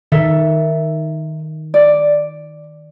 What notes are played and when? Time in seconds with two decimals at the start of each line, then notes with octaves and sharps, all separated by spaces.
0.12 D#3 A4 A#4 E5
1.74 D5